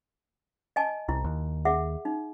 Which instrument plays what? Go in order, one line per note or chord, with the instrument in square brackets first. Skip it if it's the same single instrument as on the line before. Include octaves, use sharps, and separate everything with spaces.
[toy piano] D#5 G#5 A5
[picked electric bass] C2 [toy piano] E4
[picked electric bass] D#2
[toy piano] G#4 E5 F#5
D#4